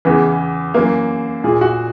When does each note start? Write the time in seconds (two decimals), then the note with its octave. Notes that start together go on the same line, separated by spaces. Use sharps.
0.05 E2 C#3 E3 B3
0.74 F#2 E3 A#3
1.44 A#2 G#4
1.61 F#4